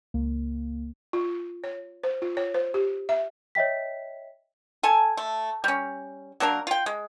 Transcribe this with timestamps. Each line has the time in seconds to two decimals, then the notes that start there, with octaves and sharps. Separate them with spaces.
0.14 C#2 A#3
1.13 F4
1.64 C#5
2.04 C5
2.22 F4
2.37 C#5
2.54 C5
2.74 G4
3.09 E5
3.55 C#5 D#5 E5 G5 B6
4.83 A4 G#5
5.17 A3
5.64 G3 C#4
6.40 F#3 A#3 D4 A#4
6.67 F4 G5
6.86 G#3